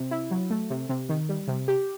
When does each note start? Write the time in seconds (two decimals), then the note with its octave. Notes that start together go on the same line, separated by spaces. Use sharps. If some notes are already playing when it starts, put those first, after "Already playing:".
Already playing: C3
0.11 E4
0.31 F#3
0.50 A3
0.70 C3
0.89 C3
1.09 D#3
1.29 G3
1.48 C3
1.68 G4